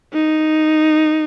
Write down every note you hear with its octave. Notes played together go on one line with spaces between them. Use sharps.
D#4